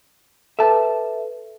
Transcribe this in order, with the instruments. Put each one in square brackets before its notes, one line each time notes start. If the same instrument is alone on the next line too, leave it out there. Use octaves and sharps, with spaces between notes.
[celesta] A4 B4 [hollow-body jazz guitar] E5 A5